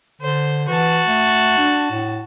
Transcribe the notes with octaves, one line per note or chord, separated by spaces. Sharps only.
D3 C5
E3 F#4 A5
A3
D4
A2